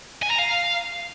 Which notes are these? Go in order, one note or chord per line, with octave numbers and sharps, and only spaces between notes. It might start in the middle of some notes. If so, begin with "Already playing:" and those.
G#5
A#5
F5